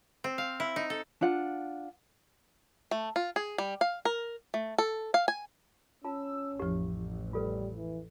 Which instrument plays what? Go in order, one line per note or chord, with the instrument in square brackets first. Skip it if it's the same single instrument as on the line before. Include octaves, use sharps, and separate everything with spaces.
[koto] C4
F5
E4
D#4
A4
[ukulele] D4 F4 F#5
[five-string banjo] A3
F4
G#4
G3
F5
A#4
A3
A4
F5
G#5
[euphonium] C#4 [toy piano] F4 A5 [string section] E6
[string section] A1 [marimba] F2 F3 [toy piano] G4
[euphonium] G3 [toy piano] F4 A4 B4
[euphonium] E3